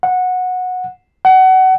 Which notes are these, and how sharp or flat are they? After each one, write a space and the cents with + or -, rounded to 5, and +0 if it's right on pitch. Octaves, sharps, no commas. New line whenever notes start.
F#5 -15
F#5 +25